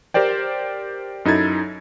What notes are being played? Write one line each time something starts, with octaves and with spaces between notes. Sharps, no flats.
G4 A#4 C5 D5 G5
F#2 D#4 E4 A4 G#6 A6